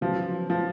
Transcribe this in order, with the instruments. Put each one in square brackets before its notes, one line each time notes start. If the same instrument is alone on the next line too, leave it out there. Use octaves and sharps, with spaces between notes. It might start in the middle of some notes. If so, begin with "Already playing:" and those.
[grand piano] C#3 F#3 B3 F4 [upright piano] F3
[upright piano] F3